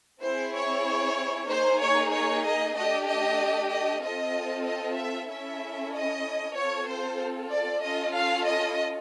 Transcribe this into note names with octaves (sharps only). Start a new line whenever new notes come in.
C4 E4 G#4 C5
C#5
A#3 D#4 G#4 C5
C#5
C#5
D#5
A3 D4 G4 D#5
D#5
D#5
C4 F4 A4 D#5
D#5
E5
C#4 E4 A4 E5
D#5
C4 F4 A4 C#5
C5
D5
C#4 F4 A4 D#5
F5
D#5